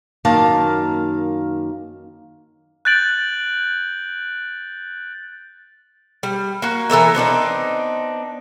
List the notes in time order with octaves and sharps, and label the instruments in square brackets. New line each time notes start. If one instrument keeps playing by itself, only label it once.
[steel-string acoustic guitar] F#2 D#3 A#3 F5 A5
[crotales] F#6 G6 A6 D7 F#7
[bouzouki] G3
A#3 F#4
E3 A4 A#4 E5
B3 C4 D4 D#4